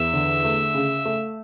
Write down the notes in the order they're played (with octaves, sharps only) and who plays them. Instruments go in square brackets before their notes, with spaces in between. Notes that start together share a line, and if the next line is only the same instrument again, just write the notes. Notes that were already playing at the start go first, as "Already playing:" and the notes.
Already playing: [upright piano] E2 [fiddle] E5
[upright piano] D3
A3
C#3
A3